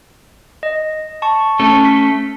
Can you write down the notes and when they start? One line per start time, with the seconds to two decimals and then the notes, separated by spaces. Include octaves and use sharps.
0.63 D#5
1.22 A5 C#6
1.59 A3 C#4 A4
1.85 B6